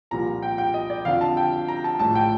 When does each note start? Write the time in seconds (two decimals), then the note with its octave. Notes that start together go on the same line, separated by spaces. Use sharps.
0.11 C2 A#2 F3 A#5
0.42 G5
0.58 G5
0.74 D#5
0.90 D5
1.05 F2 D3 F3 F5
1.21 A5
1.37 G5
1.68 A#5
1.84 A5
1.99 A#1 A2 F3 A5
2.15 G5